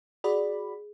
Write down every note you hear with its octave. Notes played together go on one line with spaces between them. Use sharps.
F#4 G#4 D5 B5